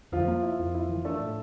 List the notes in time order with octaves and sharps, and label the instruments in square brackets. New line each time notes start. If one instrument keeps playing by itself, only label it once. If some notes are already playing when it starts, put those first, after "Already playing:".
[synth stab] F2 [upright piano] F3 F4
[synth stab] A#3
E4
F2
E4
E3
[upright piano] A3 A4 [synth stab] D4
[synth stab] A2